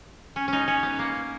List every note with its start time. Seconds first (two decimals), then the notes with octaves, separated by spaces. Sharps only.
0.36 C#4
0.48 C#4 D#4
0.68 C#4
0.83 B3
0.99 A#3